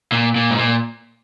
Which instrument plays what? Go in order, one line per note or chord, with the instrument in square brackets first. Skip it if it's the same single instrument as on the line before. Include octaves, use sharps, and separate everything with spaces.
[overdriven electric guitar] A#2
A#2
G#2
A#2